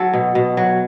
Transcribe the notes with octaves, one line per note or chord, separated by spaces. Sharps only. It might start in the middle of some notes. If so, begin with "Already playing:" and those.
Already playing: F#3 A4
B2
B2
F#3